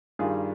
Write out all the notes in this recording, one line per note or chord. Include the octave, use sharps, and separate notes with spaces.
G2 D#3 G3 F4 G#4